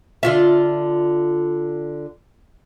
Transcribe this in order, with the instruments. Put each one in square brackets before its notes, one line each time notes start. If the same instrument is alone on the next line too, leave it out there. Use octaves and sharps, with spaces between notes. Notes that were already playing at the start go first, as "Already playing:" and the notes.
[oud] D3 F4 E5